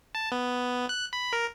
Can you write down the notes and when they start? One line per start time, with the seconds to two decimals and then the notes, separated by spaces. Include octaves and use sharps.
0.15 A5
0.32 B3
0.89 F#6
1.13 B5
1.33 A#4